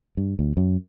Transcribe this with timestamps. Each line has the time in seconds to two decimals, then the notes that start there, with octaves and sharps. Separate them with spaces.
0.17 G2
0.39 D2
0.57 F#2